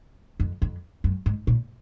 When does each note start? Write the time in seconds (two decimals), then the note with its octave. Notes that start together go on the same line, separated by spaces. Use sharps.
0.40 F2
0.62 F2
1.04 F#2
1.26 G#2
1.47 A#2